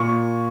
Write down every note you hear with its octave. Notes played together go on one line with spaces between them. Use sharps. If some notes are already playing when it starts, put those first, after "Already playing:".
Already playing: A#2 C#6